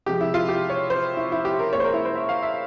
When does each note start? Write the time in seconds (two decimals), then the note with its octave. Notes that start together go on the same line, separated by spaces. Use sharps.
0.06 C3 F3 G#3 G4
0.21 E4
0.34 F4
0.49 G4
0.70 C#5
0.90 C5
1.17 E4
1.32 E4
1.45 G4
1.59 A#4
1.73 A#2 G#3 C#5
1.80 C5
1.84 A#4
1.94 E4
2.05 C5
2.15 E5
2.29 F5
2.43 E5